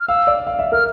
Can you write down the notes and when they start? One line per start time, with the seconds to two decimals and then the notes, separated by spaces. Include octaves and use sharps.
0.01 F6
0.08 F5 E6
0.27 D5
0.47 F5
0.59 E5
0.72 A#4 F6